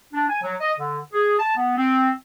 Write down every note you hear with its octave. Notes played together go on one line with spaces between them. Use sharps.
D4
G#5
F#3
D#5
D3
G#4
A5
B3
C4